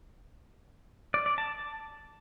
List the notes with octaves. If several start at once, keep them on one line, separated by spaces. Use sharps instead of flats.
D5
D5
A5